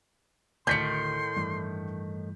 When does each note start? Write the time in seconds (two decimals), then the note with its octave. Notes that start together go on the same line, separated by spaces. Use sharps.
0.67 D2 A2 D#3 C6 G6 B6 C#7
1.36 G2 E3 A3